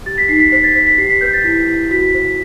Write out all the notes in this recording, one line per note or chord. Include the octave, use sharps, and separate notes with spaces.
G4 A6
B6
D#4 C7
B6
C5 B6
A6
C5 B6
B6
G4 C7
B6
B4 G6
A6
E4 B6
E4
F#4 B6
B6
C5
B6